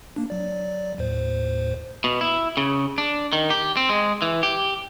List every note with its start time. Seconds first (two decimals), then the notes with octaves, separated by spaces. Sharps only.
0.16 A#3 D4
0.30 F#3 D5
0.98 D#2 A2 C5
2.04 B2
2.21 E4
2.57 C#3
2.98 D4
3.33 D#3
3.50 G4
3.77 C4
3.89 G#3
4.22 E3
4.43 G4